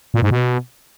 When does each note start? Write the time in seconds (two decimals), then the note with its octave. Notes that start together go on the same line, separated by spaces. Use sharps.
0.14 A#2
0.22 G#2
0.31 B2